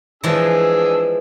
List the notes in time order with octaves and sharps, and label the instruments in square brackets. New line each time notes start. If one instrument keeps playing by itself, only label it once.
[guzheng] E3 F3 G#3 [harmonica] D4 G#4 E6